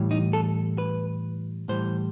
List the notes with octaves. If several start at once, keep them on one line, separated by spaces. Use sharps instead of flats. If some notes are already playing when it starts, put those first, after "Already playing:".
Already playing: A2 E3 G3
D#4
A4
B4
A2 E3 G3 C5